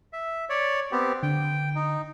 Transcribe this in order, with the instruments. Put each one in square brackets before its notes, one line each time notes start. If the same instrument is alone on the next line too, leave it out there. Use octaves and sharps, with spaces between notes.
[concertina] E5
C#5 D5
B3 C4 G4
[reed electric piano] D3 [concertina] G5
[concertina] D#4